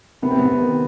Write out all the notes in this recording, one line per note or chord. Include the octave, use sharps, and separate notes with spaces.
C3 B3
C4
C3 B3
D#3